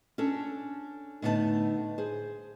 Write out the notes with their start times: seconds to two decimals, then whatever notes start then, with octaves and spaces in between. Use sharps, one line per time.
0.18 C#4 D4 A4 A5
1.22 A2 D3 B3 D#4 C#5 A5
1.98 G#4 C5